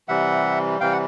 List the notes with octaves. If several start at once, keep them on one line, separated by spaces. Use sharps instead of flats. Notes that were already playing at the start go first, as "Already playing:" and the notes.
C3 E3 G3 E5 F#5
C3 E3 G3 F5 G5
F#5